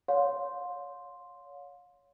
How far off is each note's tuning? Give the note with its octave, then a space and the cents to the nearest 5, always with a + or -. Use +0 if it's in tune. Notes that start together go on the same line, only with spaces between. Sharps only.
C#5 +20 F5 +35 C6 +0